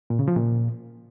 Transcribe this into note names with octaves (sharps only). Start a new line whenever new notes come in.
A#2
C#3
F3
A#2